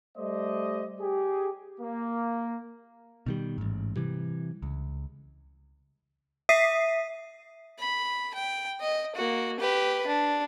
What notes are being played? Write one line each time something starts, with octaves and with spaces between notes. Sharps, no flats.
G3 A3 C5 D5 D#5
G4 G#4
A#3
B2 D#3 G3
A1 G#2
C3 E3 G3
C#2
E5 D#6 B6 C7 D#7
B5
G5
D#5
A#3 F#4
G4 B4
D4